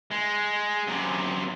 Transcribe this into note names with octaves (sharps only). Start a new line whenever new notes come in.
G#3
F#2 C3